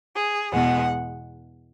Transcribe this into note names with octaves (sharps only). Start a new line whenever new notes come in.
G#4
E2 B2 G#3 F#5